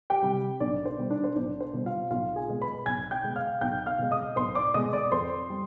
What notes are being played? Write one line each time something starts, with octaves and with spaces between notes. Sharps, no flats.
G4 G5
C3 G3
B1 D4 D5
C5
B2 G3
D4 D5
C5
B1 D4 D5
C5
B2 G3
F4 F5
B1 F4 F5
G#4 G#5
B2 G#3
B4 B5
B1 G#5 G#6
G5 G6
B2 G#3
F5 F6
B1 G5 G6
F5 F6
B2 G#3
D#5 D#6
B1 C5 C6
D5 D6
B2 G#3 D#5 D#6
D5 D6
F2 C5 C6
G3